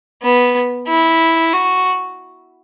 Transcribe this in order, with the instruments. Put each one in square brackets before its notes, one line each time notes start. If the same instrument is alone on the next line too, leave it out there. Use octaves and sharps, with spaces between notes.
[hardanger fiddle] B3
E4
F#4